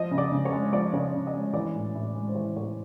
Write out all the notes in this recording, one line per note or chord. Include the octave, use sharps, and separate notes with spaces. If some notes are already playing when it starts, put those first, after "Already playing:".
Already playing: F3 D#5
C#3
D5
C#3
C#5
G#3
F3 D5
C#3 C#5
D5
C#3
D#5
G#3
E3 D5
A2
A2
G#3
C5
E3 C#5
A2 C#5